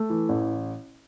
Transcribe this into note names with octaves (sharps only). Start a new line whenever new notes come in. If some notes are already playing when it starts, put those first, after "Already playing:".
Already playing: A3
E3
A1